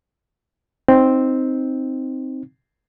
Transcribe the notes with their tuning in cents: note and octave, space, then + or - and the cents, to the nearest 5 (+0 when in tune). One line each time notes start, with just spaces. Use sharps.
C4 +0 D#4 +0